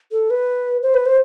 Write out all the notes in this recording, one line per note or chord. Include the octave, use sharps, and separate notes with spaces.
A4
B4
C5
B4
C5